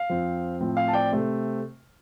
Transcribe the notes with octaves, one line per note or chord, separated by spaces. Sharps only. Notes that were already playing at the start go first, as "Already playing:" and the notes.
Already playing: F5
F2 F3 C4
A2 F3 C4
F5
A5
D5 G5
C3 A3 C4